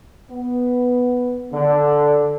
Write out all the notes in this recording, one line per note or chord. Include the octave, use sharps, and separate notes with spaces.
B3
D3